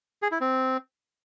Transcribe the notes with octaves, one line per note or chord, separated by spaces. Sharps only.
G#4
E4
C4